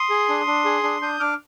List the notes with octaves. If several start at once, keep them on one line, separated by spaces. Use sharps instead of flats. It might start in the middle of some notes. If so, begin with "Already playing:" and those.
Already playing: C6 D#6
G#4
D4
D4
G#4
D4
D4 D#6 G6
D4 D6 F6